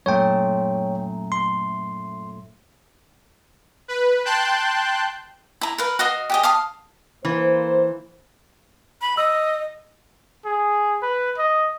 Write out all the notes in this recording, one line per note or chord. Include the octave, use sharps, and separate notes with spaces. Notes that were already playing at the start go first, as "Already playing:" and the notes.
F#2 A#2 A3 C#5 G5
C6
B4
G5 A5 C6 F#6 G6
E4 A#5
A#4 B4 F5
F#4 D#5 F5 D#6
G4 G#4 D#5
F5 A5 D#6
E3 A#3 C5
B5
D#5 E6
G#4
B4
D#5